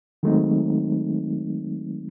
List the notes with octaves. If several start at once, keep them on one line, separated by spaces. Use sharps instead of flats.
D#3 F#3 G#3 A3 C4 D#4